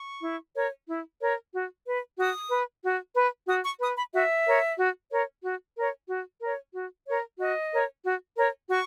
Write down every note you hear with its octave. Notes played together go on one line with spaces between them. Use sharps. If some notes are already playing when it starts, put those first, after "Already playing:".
Already playing: C#6
E4
A#4 C#5
E4
A#4 C#5
F#4
B4
F#4 D#6
B4
F#4
B4
F#4 D#6
C#6
B4 D#6
B5
F#4 E5
A#4 C#5
F#4
A#4 C#5
F#4
A#4 C#5
F#4
A#4 C#5
F#4
A#4 C#5
F#4 D#5
A#4 C#5
F#4
A#4 C#5
F#4 C#6